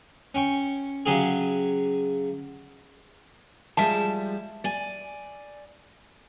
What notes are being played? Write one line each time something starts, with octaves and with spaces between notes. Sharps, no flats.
C#4 G5 C#6
C#3 F#3 G4 G#4
F3 G3 G#3 E5 A5
D5 G#5